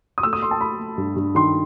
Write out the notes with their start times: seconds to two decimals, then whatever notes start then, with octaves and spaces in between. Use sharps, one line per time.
0.18 D#6
0.23 A3 E6
0.33 D#6
0.42 A3 C6
0.51 A5
0.61 A3 B5
0.79 A3
0.98 G2
1.16 G2
1.35 D#3 C6